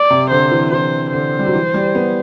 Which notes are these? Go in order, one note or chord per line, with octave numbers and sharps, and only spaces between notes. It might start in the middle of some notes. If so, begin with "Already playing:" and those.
Already playing: D5
C3
D3 C5
E3
E3 C5
D3 C5
G3
F#3
E3
G3
B3